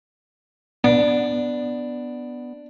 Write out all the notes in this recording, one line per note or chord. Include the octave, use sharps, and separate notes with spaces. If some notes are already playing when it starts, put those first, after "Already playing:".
B3 D4